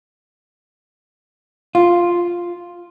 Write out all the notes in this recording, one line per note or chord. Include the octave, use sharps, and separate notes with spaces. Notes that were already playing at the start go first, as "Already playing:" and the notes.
F4